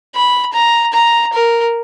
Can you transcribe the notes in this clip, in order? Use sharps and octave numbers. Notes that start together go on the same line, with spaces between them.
B5
A#5
A#5
A#4